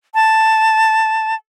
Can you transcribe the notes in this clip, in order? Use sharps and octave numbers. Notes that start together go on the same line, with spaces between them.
A5